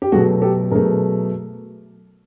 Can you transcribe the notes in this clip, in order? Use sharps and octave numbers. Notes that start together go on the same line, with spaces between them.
G4
B2 F#3 A3 F#4 G#4
G4 A4
B2 F#3 A3 G#4 A#4